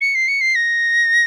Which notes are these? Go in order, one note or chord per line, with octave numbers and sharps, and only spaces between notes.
C#7
C7
C#7
C7
A#6